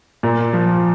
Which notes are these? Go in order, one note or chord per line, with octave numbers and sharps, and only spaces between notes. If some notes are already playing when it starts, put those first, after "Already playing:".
A#2
F3